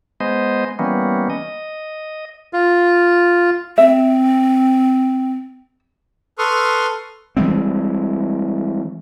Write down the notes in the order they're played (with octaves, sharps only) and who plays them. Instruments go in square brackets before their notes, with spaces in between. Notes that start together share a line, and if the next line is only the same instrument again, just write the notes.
[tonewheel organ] G#3 B3 C5 D#5
E3 G3 A#3 B3 C#4
D#5
[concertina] F4
[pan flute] C4 [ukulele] E5
[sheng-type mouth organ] A4 B4 C6 C#6 D#6 F6
[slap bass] E3 G3 G#3 C4